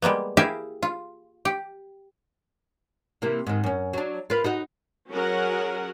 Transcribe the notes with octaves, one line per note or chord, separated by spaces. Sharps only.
G3 G#3 A#3 B3
E4 G4 G#4 A#4 E5 F5
F4
G4
C3 E3 A#3
G#2 D#3
F#2 C#4
F#3 D4
F4 A#4 B4
D#4 F#4 D#5
F#3 C#4 F#4 G#4 A#4 F#5